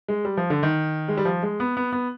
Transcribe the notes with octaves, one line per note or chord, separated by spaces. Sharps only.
G#3
G3
F3
D3
D#3
G#3
G3
F3
G#3
B3
B3
B3